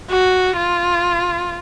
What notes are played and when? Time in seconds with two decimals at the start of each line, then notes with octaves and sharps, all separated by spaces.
0.10 F#4
0.56 F4